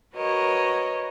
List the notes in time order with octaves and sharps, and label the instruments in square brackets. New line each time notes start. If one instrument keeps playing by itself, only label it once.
[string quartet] F#4 A#4 B4 C#5 D#5